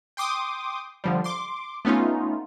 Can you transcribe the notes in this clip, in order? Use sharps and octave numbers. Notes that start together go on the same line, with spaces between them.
G5 C6 D6 D#6
D3 F3 G3
C6 D6
A3 B3 C#4 D#4 F4